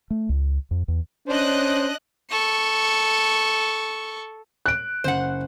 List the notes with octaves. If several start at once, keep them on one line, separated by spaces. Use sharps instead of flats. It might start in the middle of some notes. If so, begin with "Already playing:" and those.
A3
C#2
F2
E2
C#4 D4 C5 D#5 F#6
A4 C#6
F#6 D7
F#1 C5 F#5